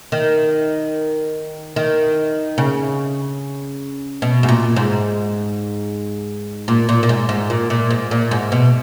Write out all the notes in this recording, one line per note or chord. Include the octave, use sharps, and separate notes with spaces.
D#3
D#3
C#3
B2
G#2
A#2
G#2
A#2
A#2
A#2
G#2
G#2
A#2
A#2
G#2
A#2
G#2
B2